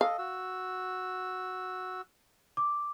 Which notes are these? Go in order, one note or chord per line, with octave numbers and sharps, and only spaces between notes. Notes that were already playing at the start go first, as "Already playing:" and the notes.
A4 D#5 F5
F#4 E6
D6